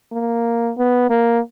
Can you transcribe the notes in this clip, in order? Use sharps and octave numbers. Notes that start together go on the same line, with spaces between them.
A#3
B3
A#3